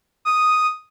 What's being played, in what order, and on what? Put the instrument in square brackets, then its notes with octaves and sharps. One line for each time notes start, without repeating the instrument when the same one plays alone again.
[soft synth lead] D#6